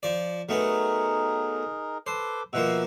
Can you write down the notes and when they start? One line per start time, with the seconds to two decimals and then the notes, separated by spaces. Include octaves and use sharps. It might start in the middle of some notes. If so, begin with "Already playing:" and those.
0.03 F3 D5
0.49 F#3 A3 B3 D#4 G#4 A#4
2.07 A4 B4 C5 D6
2.53 B2 F3 A#3 E5 F#5 E6